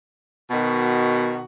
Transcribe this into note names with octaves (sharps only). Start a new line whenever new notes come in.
B2 D#3 F#4